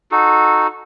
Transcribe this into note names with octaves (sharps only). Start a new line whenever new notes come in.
D#4 F#4 A4